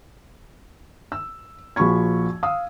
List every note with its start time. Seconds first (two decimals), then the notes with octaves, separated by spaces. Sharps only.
1.12 E6
1.76 A#1 F3 F#4 B5 C#6 G#6
2.43 F5 D#6 E6